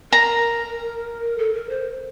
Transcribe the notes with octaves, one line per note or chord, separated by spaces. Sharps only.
A#4 A#5
A4
A#4
C5